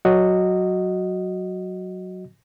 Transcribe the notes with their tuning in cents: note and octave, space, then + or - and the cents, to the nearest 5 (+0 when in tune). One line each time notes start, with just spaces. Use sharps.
F#3 +0 F#4 +0 D#5 +0